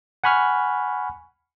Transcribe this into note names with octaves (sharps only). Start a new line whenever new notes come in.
F#5 G#5 B5 C#6 F6